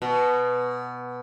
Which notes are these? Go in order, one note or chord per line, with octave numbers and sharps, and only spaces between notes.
B2